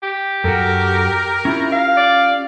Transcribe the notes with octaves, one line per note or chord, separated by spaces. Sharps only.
G4
F#2 F#4 A4 A#4
C#4 E4 F4 G4
F5
D5